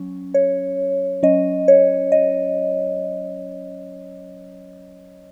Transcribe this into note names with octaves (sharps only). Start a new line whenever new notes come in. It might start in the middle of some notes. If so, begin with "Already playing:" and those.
Already playing: F#3 C#4
C#5
F#3 C#4 D#5
C#5
D#5